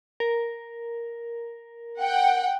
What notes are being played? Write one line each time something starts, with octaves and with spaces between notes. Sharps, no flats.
A#4
F#5 G5